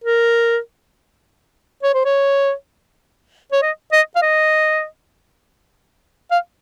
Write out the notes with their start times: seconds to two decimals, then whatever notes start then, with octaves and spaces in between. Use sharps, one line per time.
0.04 A#4
1.83 C#5
1.94 C5
2.05 C#5
3.52 C#5
3.62 D#5
3.92 D#5
4.16 F5
4.22 D#5
6.31 F5